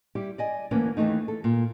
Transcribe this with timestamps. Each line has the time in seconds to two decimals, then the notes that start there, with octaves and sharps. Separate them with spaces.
0.15 G3 E4 G4
0.38 D5 D#5 G#5
0.71 D2 E3 A#3 C#4
0.97 D#2 E3 F3 A3 D#4
1.28 A4
1.44 A#2